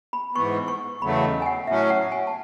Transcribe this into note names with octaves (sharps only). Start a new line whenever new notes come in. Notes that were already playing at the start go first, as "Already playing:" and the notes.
B5
G#2 E3 B3 C#6
C#6
E2 C#3 F#3 A3 B5
D#5
G#5
F#5
A2 F#3 C#4 E5
F#5
G#5
A5